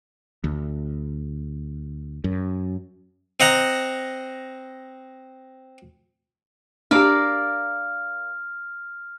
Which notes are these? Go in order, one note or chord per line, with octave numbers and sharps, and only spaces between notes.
D2
F#2
C4 D#5 F#5 A#5
D4 G4 A#4 D5 F5 F6